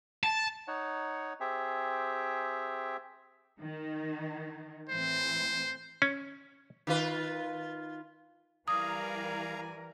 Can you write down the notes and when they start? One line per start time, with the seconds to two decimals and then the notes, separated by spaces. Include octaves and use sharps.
0.23 A5
0.68 D#4 C#5 F#5
1.40 C4 G4 G#4 E5
3.59 D#3 D#4
4.89 A2 E3 C4 C5
6.02 C#4
6.87 D#3 F4 B4
8.68 E3 G3 A#4 D5 F5 G#5 A#5 D#6